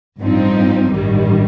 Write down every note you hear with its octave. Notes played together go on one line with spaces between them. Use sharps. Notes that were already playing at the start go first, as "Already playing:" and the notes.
A1 G2 F3 C4 D#4
A1 G2 D#3 G3